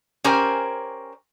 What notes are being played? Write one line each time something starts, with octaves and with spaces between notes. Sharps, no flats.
C#4 G4 A#4 C5 D5 G#5